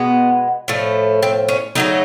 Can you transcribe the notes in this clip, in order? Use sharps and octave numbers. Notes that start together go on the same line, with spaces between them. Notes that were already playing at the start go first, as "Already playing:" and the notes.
Already playing: B2 G#3 B3
A2 F3 A3
C4
C#4
C#3 F#3 A3 D#4